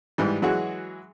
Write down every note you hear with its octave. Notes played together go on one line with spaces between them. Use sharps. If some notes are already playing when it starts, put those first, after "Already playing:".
G#2 E3 G3
E3 F#3 G#3 F#4 G#4